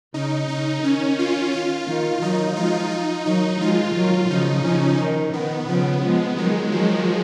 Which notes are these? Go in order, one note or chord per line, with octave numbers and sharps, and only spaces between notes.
C#3 D#4
C#3 D#4
D#3 C#4
F4
F4
D#3
D#3 F#3 D#4
F3 G#3 F4
D#4
D#3 F#3 D#4
F3 G#3 F4
D#3 F#3
C#3 F3 D#4
C#3 F3 C#4
D#3
D#3 B3
C#3 F3 B3
F3 G#3
D#3 F#3 G#3
D#3 F3 F#3